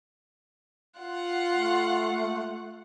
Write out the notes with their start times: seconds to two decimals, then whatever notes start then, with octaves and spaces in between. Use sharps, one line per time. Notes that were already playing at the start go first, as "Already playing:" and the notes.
0.99 F4 F#5
1.52 A3